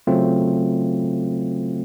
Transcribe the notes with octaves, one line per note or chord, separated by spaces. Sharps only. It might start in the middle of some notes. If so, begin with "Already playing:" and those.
C#3 F#3 A3 C4 F4